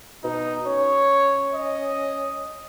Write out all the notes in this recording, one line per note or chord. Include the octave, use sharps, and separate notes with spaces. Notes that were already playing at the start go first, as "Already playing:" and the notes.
B2 D#4
C#4 C#5
D#5